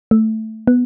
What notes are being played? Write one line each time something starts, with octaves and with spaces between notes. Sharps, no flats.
A3
B3